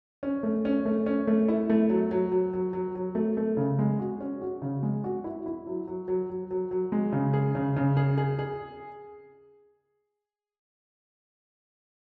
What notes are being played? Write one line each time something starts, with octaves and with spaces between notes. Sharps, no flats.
C#4
A3
C#4
A3
C#4
A3
E4
A3
F#3
F#3
F#3
F#3
F#3
F#3
A3
A3
C#3
G#3
F#4
C#4
F#4
C#3
G#3
F#4
E4
E4
F#3
F#3
F#3
F#3
F#3
F#3
G#3
C#3
G#4
C#3
C#3
G#4
G#4
G#4